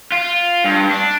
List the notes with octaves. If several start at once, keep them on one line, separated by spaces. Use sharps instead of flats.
F4
G2
D4